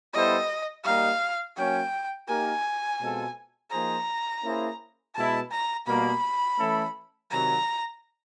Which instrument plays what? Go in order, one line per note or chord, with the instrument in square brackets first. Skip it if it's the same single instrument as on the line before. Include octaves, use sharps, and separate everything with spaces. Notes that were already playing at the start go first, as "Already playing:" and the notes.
[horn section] G3 B3 E4 A4 C5 [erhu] D#5
[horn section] G3 A#3 D#4 [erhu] F5
[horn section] F#3 A#3 C#4 [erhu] G5
[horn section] A#3 D#4 G4 A#4 [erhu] G#5
[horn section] B2 G#3 C4 F4 A4
[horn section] F3 A#3 D#4 G#4 C5 [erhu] A#5
[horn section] A#3 C#4 E4 G#4 C5
[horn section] B2 G#3 B3 E4 [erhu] A5
[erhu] A#5
[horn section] B2 G3 A#3 [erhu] B5
[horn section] E3 A3 C#4 E4 A4
[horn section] C3 D#3 F#3 [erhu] A#5